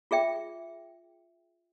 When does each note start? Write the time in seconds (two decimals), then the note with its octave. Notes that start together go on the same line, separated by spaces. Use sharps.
0.11 F4 G#4 E5 G5